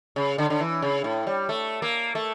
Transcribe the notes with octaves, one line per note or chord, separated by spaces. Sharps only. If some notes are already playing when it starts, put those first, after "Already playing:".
C#3
D3
D3
E3
C#3
A2
G3
A3
A#3
A3